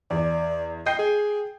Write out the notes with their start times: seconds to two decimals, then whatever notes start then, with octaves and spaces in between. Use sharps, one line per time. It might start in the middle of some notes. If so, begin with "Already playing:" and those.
0.11 E2 D5
0.86 D#5 G5 G6 C7
0.99 G#4